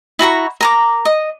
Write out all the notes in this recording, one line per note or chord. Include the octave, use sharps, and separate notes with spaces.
E4 F#4 A#5 C#6
A#4 A#5 D6
D#5